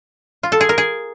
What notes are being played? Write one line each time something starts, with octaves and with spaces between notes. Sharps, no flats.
F4
A4
G#4
A#4
G#4